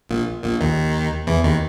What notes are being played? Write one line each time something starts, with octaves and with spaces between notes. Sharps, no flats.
A#1 A#2
A#1 A#2
D#2 D#3
E2 E3
D#2 D#3